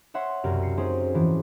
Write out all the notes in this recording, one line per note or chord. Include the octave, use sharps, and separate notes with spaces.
C#5 E5 F#5 C6
C2 F#2 B2 A#4
C7 C#7
C4 C#4 D#4 G#4 C5
G#2 E3 F3